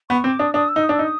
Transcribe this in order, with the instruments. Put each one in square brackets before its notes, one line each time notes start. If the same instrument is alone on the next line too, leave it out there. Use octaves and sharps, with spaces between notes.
[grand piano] B3 [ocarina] C#6
[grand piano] C4 [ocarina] D6
[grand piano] D4 [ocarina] D#6
[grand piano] D4 [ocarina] D#6
[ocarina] E6
[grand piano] D#4
[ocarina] D#6
[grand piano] D4
[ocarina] E6
[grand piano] D#4
[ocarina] D#6